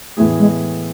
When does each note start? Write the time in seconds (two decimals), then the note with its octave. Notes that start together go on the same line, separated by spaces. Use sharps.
0.17 A2 E3 A3 B3 E4 G#4
0.39 G#3